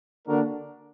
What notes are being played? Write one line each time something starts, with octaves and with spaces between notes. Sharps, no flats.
D3 A#3 D4 F#4 A#4